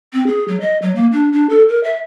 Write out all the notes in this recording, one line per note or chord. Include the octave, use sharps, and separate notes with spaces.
C4
G#4
F#3
D#5
F#3
A#3
D4
D4
A4
A#4
E5